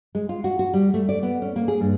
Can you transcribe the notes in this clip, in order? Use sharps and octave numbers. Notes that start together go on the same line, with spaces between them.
G#3
F4
F#4
F#4
G3
A3
D5
B3
C#4
A#3
G#4
G2